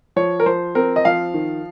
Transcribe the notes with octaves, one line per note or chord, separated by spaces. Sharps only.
F3 C#5
A#4
F3 C5
C4 A#4
D#5
F3 F5
D#3